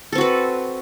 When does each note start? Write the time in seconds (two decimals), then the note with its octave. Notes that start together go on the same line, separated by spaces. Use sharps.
0.12 A4
0.15 C4
0.18 F#4
0.21 B4